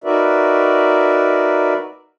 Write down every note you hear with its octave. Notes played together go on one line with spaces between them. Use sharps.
D#4 F#4 A#4 B4 D5 E5